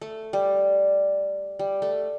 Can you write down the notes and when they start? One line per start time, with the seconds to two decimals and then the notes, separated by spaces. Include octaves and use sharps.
0.01 A3
0.33 G3
1.59 G3
1.82 A3